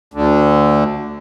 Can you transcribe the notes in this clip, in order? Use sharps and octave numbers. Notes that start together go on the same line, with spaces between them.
D2 D3